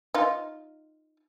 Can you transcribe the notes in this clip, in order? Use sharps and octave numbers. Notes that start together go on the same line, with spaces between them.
D#4 F4